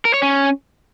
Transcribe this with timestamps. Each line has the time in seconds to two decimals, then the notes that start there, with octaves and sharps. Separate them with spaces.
0.05 A#4
0.14 C#5
0.22 C#4